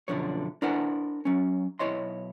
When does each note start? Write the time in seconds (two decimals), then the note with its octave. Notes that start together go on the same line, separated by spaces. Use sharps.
0.08 F#2 B2 D3 F3 C#5
0.62 D4 E4 A#4 C5 F#5 G#5
1.25 F#3 C#4
1.79 B1 E4 C#5 D#5 C6